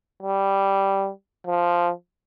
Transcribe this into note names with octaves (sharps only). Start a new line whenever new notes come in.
G3
F3